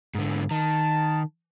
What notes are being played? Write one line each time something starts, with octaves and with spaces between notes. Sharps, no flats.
G#2 D3
D#3 A5